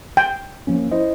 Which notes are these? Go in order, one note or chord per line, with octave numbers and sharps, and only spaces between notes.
G5
F3 A#3 C#4
E4 C5 D#5